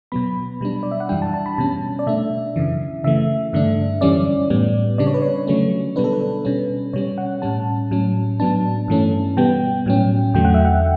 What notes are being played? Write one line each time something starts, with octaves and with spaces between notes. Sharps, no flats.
B2 F#3 B3 B5
B2 G3 D4
D5
E5
F#5
F#2 E3 G3 D4 G5
A5
A5
B5
B2 G3 C#4 A5
D5
B2 A3 D4 E5
F#2 C#3 E3
C#3 E3 A3 E5
G2 D3 A3 D4
F#2 E3 G3 C#4 D5
A2 G3 B3
C#3 G3 D4 D5
C#5
B4
C#5
D3 F#3 A3 C#4
B2 G3 B3 D4 B4
A4
B4
B2 G3 C#4
B2 G3 C#4 C#5
F#5
A2 G3 C#4 A5
A2 F#3 C#4
A2 F#3 B3 D4 A5
G2 E3 A3 C#4
B2 G3 B3 G5
A2 F#3 C#4
E2 D3 F#3 A3 G5
F#5
E5
F#5